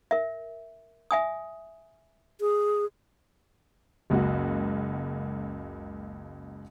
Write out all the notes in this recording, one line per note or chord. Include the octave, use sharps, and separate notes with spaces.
A#4 E5
E5 G#5 D#6
G#4
F#1 C#2 A#3 F#4